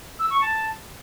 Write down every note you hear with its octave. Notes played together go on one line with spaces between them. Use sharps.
E6
C#6
A5